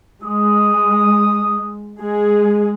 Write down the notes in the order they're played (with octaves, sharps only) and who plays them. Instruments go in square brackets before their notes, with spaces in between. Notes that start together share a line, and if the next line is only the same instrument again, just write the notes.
[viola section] G#3 [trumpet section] D#6
[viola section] G#3 G#4